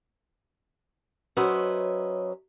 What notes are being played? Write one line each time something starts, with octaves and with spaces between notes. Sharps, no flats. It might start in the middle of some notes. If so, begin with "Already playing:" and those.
F#3 C#4 B4 C5 D#5 E5